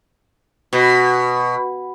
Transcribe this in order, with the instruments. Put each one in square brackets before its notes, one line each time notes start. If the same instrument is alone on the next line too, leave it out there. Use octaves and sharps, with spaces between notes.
[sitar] B2